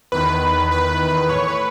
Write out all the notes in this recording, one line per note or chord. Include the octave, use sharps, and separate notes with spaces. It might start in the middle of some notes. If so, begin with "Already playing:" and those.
E2 D#3 B4
B4
A2 E3 C#5
B4